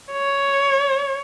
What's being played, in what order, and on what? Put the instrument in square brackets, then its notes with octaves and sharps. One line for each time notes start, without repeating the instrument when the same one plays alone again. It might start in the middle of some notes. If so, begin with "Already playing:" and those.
[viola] C#5